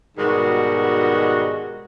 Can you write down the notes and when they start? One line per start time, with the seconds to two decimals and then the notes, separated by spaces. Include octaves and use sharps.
0.18 G#2 B2 D#3 G3 G#3 F#4